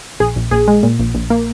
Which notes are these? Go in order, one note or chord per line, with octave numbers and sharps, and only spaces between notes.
A#1 G#4
A#1
A#1 G#4
G#3
A#2
A#1
A#1
A#3